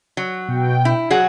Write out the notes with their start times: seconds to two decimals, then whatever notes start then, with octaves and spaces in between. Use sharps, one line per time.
0.17 F#3
0.48 B2 G5
0.85 E4
1.11 F#3 F#4 G#4 F#5